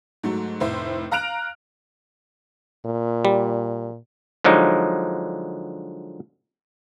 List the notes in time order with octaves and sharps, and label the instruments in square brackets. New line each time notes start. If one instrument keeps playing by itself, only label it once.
[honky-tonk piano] G#2 F#3 A3
F1 A2 C5 E5
F5 A#5 F6 F#6 D7 F7
[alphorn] A#2
[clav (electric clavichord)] G3
D3 F3 F#3 G#3 D#4